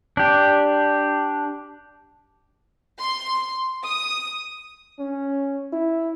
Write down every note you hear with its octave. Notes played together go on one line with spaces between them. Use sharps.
D4 G4
C6
D#6
C#4
E4